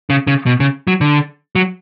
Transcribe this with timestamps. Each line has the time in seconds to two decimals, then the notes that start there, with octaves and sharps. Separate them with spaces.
0.10 C#3
0.27 C#3
0.46 B2
0.60 C#3
0.87 F#3
1.01 D3
1.55 F#3